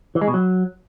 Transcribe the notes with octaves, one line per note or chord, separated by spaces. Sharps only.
E3
G#3
B2
F#3